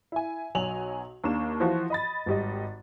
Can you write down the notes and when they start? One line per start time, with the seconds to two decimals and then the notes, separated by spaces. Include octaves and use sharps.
0.12 E4 G#5
0.55 B1 F#3 G#5 F7 F#7
1.24 D#2 A#3 D4 E7
1.60 E3 F3 F4 F#4 C#6
1.90 D#5 B5 A6
2.26 G#1 G3 D#5